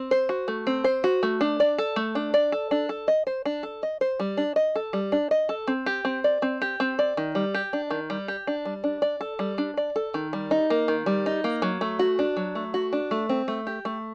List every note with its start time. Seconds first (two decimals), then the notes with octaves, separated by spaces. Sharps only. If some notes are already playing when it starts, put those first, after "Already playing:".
Already playing: C4
0.11 C5
0.29 F#4
0.48 A3
0.67 C4
0.84 C5
1.04 F#4
1.23 A3
1.41 D4
1.60 D5
1.78 A4
1.96 A3
2.15 D4
2.34 D5
2.52 A4
2.71 D4
2.89 A4
3.08 D#5
3.27 C5
3.45 D4
3.63 A4
3.83 D#5
4.01 C5
4.20 G3
4.37 D4
4.56 D#5
4.76 A4
4.93 G3
5.12 D4
5.31 D#5
5.49 A4
5.67 C4
5.86 G4
6.05 C4
6.24 D5
6.42 C4
6.62 G4
6.80 C4
6.99 D5
7.17 D#3
7.35 G3
7.54 G4
7.73 D4
7.91 D#3
8.10 G3
8.28 G4
8.47 D4
8.65 G3
8.84 D4
9.02 D5
9.21 A4
9.39 G3
9.58 D4
9.77 D5
9.96 A4
10.14 D#3
10.33 G3
10.51 D#4
10.70 A#3
10.88 D#3
11.06 G3
11.26 D#4
11.44 A#3
11.62 F#3
11.81 A3
11.99 F#4
12.19 D4
12.37 F#3
12.55 A3
12.74 F#4
12.93 D4
13.11 A3
13.29 C4
13.48 A3
13.67 G4
13.85 A3